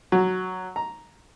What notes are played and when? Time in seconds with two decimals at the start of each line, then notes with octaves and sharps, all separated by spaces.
0.12 F#3
0.76 A#5